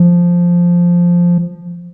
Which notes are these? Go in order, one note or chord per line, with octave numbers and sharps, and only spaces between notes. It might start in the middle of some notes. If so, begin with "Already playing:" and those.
Already playing: F3